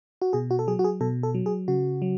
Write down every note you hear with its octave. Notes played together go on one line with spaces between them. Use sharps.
F#4
B2 G#4
F#4
A4
F#3 G#4
F#4
G#4
B2 A4
A4
F#3
G#4
C#3 F#4
F#3